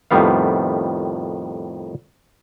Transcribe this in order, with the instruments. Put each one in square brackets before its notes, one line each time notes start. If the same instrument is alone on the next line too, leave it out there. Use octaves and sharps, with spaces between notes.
[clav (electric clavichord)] F2 A2 D#3 G3 B3 F5